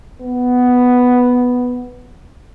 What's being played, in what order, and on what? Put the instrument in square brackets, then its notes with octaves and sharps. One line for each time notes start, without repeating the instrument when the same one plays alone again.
[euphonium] B3